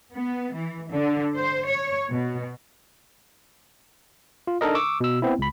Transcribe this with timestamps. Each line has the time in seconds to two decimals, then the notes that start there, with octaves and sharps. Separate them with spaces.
0.13 B3
0.53 E3
0.90 D3
1.36 C5
1.67 C#5
2.09 B2
4.47 F4
4.61 D4 D#4 A4 A#4 D#5
4.75 C#6 D6 E6
5.00 B2 E6
5.22 B3 C4 E4
5.39 C#2 B5